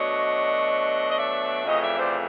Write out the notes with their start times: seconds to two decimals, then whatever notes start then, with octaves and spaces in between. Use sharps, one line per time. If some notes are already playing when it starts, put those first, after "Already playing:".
Already playing: B2 F#3 A3 D4 C#5 D#5
1.09 D#5
1.17 D5 E5
1.65 F2 C#3 E3 A3 C#5 D#5
1.81 D5 E5
1.98 C5 D5